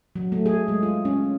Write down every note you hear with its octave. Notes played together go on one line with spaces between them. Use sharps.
F#3
A3
G#4
G#3
F4
C#4